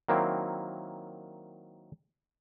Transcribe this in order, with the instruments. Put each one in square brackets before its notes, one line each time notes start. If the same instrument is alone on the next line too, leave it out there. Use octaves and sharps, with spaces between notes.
[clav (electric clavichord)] D#3 F#3 A#3 C4 E4